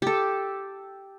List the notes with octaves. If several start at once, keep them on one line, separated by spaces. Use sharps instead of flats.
G4 A4